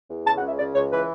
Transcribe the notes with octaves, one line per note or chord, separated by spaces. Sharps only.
E2
C#3 A5
F#5
C#2
E5
C#3 D5
C#2 C#5
E3 B4